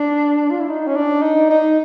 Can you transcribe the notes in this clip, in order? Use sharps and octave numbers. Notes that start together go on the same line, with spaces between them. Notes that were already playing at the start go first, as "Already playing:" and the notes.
Already playing: D4
F4
E4
D#4
C#4
D4
D#4
D#4